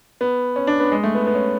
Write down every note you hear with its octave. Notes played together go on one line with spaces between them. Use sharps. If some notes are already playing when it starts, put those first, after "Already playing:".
B3
C#4
D4
B3
G#3
A3
B3
B3
C#4